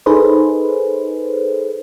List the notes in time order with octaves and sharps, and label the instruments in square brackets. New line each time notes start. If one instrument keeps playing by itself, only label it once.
[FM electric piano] D#4 G#4 A4 B4 C5